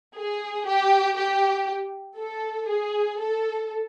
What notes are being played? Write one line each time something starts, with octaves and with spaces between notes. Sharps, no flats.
G#4
G4
G4
A4
G#4
A4